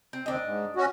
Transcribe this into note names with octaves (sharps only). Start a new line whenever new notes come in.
C4
D#2 C4 D4 D#5
G#2
C#4 F#4